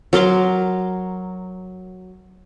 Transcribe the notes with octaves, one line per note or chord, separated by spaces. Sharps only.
F#3 A#4 C6 D6